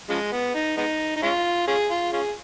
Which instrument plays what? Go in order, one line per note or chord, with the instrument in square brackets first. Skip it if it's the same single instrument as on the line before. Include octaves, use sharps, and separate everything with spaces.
[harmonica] C#3 F3 G#3
B3
D#4
G#3 B3 D#4
D#4
G#3 C#4 F4
C#4 F4 G#4
F4
C#4 F4 G#4